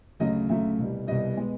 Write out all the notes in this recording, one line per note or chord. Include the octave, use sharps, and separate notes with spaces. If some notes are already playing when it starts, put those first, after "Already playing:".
D2 C#3 F#3 A3 D#5
D2 C#3 F#3 A3 E5
C2 B2 G3
C2 B2 G3 D#5
B2 G#3 B3